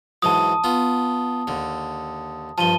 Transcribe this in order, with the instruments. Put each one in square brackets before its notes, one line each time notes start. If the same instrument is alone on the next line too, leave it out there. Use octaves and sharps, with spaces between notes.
[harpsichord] G#2 E3 F#3 [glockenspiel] A5 D#6
[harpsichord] B3 F4
D#2 D3
[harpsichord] G2 F3 [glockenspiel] A5 D#7 G7